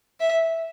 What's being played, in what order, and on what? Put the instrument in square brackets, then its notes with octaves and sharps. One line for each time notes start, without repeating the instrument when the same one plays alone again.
[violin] E5